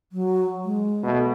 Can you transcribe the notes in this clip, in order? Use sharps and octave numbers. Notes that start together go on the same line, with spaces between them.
F#3
G#3
B2 A3